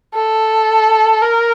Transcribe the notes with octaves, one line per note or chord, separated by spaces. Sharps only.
A4
A#4